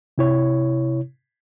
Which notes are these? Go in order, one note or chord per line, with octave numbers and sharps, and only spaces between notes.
C3 E4 C#5